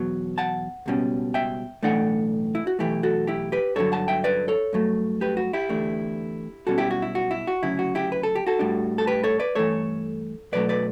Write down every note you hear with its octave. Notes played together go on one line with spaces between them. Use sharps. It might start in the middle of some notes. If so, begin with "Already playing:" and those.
Already playing: E2 B2 F#3
F#5 A5
C#2 B2 G3 C#4
E5 G5
B1 A2 E3 A3 D4 D5 F#5
E4
F#4
B1 A2 E3 A3 E4 G4
F#4 A4
E4 G4
G4 B4
G2 D3 F#3 A4 C#5
F#5 A5
E5 G5
B4 D5
A4 C#5
G2 F#3 A3
G4 B4
F#4
E4 G4
E2 D3 A3 D4
B1 B2 G3 C#4 F#4 A4
E4 G4
F#4
E4
F#4
E4
F#4
D2 C#3 F#3 E4
F#4
E4 G4
B4
A4
G4
F#4 A4
A2 G3 D4
A4
G4 B4
A4 C#5
B4 D5
G2 E3 A3 A4 C#5
B1 B2 F#3 A3 B4 D5
B4 D5